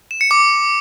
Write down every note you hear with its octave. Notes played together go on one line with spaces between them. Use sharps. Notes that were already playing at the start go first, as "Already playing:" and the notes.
E7
C#7
D6